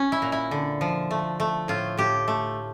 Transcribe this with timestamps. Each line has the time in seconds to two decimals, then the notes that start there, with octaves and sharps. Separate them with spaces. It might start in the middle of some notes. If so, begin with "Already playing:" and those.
Already playing: C#4
0.12 E4
0.22 A#2
0.32 E4
0.51 D3
0.81 F3
1.11 A3
1.40 A3
1.68 A2 F4
1.97 A2 G4
2.28 A3